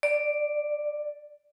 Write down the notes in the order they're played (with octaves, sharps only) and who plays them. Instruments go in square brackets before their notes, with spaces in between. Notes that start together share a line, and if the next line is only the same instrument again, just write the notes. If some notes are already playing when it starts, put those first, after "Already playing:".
[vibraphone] D5